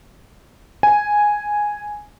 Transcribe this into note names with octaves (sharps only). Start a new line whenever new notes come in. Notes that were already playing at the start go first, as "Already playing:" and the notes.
G#5